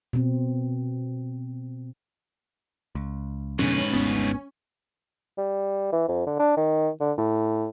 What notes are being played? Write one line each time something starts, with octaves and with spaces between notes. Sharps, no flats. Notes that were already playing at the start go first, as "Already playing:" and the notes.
B2 C4
C#2
F2 G#2 B2 D3 C#4 B4
G#1 D2 B3
G3
E3
F2
D3
D4
D#3
D3
A2